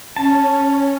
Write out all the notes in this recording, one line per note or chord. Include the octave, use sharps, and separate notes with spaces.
C#4 A5